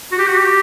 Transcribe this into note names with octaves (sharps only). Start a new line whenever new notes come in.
F#4
G4
F#4
G4